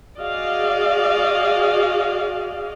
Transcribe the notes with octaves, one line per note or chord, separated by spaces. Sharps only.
F#4 G#4 D5 D#5 F5